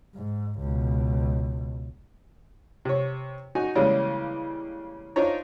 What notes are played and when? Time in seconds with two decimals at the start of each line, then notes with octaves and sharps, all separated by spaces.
0.15 G#2
0.59 C#2 B2
2.85 C3 C#5
3.55 D#4 F#4 G#5
3.75 C#3 E3 G3 G#3 A#3 C#4
5.16 D4 D#4 F4 C5 C#5 A#5